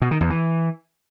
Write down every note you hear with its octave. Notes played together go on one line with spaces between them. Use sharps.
B2
D#3
E2
E3